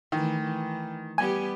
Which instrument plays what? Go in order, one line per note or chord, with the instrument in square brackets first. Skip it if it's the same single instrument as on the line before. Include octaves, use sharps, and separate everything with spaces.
[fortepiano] D#3 [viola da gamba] E3 A3
[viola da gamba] E3
[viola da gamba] G3 B3 G4 [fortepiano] G#5